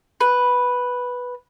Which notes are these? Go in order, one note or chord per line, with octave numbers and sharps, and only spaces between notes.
B4